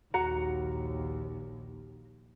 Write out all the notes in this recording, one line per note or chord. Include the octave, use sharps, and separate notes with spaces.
A#1 D#2 F#4 F#5 A#5